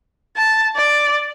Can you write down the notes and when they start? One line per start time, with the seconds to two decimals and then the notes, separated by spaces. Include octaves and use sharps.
0.37 A5
0.76 D5